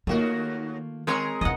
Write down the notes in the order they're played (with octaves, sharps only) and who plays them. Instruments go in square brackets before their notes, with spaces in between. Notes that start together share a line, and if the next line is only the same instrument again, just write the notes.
[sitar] D#2 F#4 [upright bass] D#3 [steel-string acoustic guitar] A3 A#3 F4
[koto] G#3 C4 C#5 [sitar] G#4 A#4
[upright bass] F1 E2 [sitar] E3 [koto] D#5 F#5